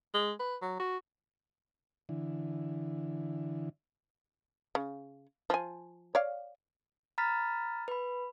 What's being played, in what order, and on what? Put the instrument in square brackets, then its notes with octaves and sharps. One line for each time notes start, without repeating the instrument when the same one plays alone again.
[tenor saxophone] G#3
B4
F#3
F#4
[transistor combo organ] D3 E3
[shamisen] C#3
F3 G#5
C#5 D5 F5
[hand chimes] A#5 B5 F6 A6 B6
B4 B5